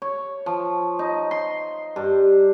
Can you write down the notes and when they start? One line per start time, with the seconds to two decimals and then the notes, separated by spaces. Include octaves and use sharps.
0.02 C#5
0.46 F3
0.99 D#4
1.31 C6
1.96 G2